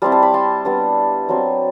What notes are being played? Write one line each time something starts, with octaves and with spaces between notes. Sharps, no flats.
G3 C4 E4 A5 C6
A5 C6
B5 D6
A5 C6
G3 B3 D4
F#3 C4 E4 A5 C6